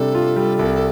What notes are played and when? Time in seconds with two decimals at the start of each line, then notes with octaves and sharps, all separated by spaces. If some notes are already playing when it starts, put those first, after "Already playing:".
Already playing: C3 G3 D4 A4
0.15 F4
0.36 G3
0.59 C2